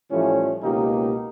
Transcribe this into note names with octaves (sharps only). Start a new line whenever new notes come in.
A2 E3 F3 G3 A3 C#4
C#2 B2 A#3 D#4 G4